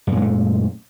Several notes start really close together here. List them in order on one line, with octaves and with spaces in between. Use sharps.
F#2 A#2 G#3 A3